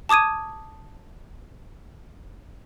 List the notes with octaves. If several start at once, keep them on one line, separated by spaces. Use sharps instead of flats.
A5 D6 D#6 G#6 D#7